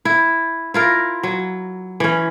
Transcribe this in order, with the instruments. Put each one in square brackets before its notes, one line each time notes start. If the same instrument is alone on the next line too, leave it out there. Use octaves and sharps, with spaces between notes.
[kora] E4
E4 F4 A#4
F#3
E3 C#4